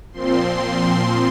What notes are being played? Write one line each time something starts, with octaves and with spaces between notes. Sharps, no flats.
A#2 F3 C4 C6